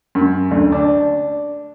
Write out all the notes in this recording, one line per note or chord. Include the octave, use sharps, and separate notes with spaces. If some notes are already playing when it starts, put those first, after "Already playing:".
F#2
D2
D4